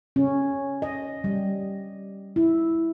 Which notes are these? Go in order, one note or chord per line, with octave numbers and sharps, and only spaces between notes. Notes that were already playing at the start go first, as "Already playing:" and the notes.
C#4
D#5
G3
E4